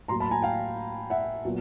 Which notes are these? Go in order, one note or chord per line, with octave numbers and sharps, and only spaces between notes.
A2 F#3 A#3 A#5 C6
A5 B5
G#5 A#5
F5 G5
E5 F#5
A#2 F#3 B3